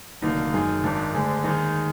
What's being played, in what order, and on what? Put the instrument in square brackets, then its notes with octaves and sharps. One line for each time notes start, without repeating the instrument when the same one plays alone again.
[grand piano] F1 D#2 D3 F#3 A#3 D#4
F#2 D#3 G#3
G#1 G#2 D#3 D4
D2 D3 G#3
D#2 D#3 G#3 D#4